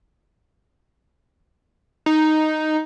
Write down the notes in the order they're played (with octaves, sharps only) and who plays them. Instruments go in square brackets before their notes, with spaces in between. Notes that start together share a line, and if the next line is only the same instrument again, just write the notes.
[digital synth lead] D#4